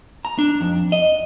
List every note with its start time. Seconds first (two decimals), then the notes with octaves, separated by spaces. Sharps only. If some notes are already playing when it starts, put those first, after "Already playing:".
0.25 A#5
0.39 D4
0.61 F2
0.92 D#5